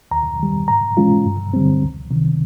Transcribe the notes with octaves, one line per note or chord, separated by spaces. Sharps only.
D#2 A#5
D#3 G3
G#2 A#5
E3 G#3 C#4 F4
G2
D3 G3 C4
C#2
C3 D#3